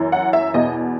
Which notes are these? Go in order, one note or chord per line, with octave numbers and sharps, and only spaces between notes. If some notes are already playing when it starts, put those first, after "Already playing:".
Already playing: F#2 E3
F#5
E5
E2 B2 D#5